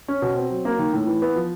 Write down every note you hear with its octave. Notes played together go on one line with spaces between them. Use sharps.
C#4
B2
C4
F#3
A#3
D#3
A2
E3
B3
F3